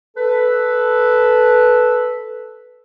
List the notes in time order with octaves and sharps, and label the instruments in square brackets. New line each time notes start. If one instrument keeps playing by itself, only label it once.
[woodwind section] A4 B4